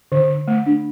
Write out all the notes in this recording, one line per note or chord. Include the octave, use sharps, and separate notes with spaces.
D3
D3
A3
D4